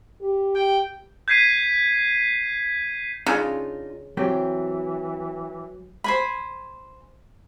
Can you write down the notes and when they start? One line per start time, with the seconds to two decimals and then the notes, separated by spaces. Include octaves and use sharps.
0.21 G4
0.55 G5
1.28 G6 G#6 B6 C7 D#7
3.26 C#3 D4 D#4 F4
4.17 E3 F#3 C4 G4
6.04 C5 G#5 B5